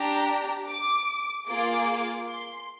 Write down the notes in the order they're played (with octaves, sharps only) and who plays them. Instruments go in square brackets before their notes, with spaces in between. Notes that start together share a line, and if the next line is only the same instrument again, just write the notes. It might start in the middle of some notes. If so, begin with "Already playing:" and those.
Already playing: [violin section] D4 G4 A#5
D6
A#3 F4 G#4 D6
C6